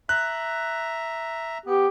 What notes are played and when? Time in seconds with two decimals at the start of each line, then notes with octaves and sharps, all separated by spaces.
0.09 E5 A#5 F#6
1.66 B3 G4